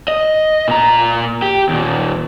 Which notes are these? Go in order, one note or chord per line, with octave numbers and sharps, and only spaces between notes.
D#5
A#2 A#5
G4
D#2 A#2